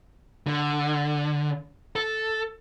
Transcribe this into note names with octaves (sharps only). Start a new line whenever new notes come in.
D3
A4